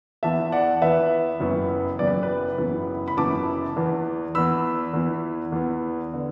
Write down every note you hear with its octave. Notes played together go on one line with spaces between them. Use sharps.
E2 E3 B3 E5 A5
D5 F#5
E2 E3 B3 B4 E5
F#1 F#2 E3 B3
F#1 F#2 E3 B3 D5
B4
B4
F#1 F#2 E3 B3
B5
F#1 F#2 E3 B3 A5 D6
E2 E3 B3
E2 E3 B3 B5 E6
E2 E3 B3
E2 E3 B3
D3 B3